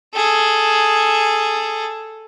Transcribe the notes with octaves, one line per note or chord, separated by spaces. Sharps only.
G#4 A4